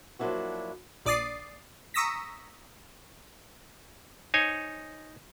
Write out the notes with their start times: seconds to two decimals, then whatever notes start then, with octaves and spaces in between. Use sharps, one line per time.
0.19 F3 F#3 A#3 D4 E4 F#4
1.05 A#1 D5 D6 D#6 A6 C7
1.94 A#5 C#6 D#6 E6 A#6 B6
4.34 D#4 C5 C#5 G#5